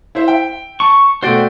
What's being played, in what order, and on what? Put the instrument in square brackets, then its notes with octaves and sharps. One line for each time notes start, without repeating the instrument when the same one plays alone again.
[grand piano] E4 C5 E5
G5
[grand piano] A5 [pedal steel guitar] C#6
[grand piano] B2 A3 F#4 [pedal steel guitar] C5 D5 G5